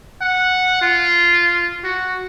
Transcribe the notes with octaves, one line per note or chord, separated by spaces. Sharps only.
F#5
F4
F#4